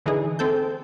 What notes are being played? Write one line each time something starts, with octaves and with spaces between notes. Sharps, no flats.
D3 E3 D#4 G#4
C4 A4 G6